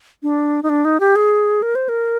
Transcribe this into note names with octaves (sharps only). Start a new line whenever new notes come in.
D4
D#4
D4
D#4
G4
G#4
A#4
C5
A#4